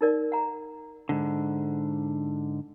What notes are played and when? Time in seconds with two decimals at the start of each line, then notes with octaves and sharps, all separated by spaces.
0.01 D#4 A#4 D5
0.32 F#5 A#5
1.09 G#2 D3